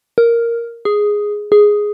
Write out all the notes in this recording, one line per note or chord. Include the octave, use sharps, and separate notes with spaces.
A#4
G#4
G#4